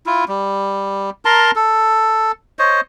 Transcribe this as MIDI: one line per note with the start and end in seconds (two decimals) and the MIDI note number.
0.06 0.25 64
0.06 0.25 65
0.28 1.10 55
1.25 1.51 70
1.25 1.51 81
1.25 1.51 82
1.25 1.51 84
1.56 2.32 69
2.59 2.81 72
2.59 2.81 73
2.59 2.81 75